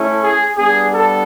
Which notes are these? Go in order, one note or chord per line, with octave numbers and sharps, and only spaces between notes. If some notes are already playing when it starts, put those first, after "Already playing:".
Already playing: A3 C#4 E4
G#4
G3 B3 D4 G#4
A4